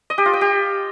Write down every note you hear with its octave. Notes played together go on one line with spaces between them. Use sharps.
D#5
G4
F4
G5
G4